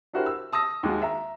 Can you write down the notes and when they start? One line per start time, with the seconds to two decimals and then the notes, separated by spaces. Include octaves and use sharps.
0.13 D4 E4 F#4 G4 A#4 C5
0.26 E6
0.53 A5 D#6 E6 A#6
0.83 D#2 G#3 F#4
1.02 E5 A#5